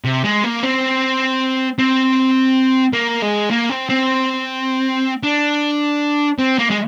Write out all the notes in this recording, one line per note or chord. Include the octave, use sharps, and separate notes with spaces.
C3
G#3
A#3
C4
C4
A#3
G#3
A#3
C4
C4
D4
C4
A#3
G#3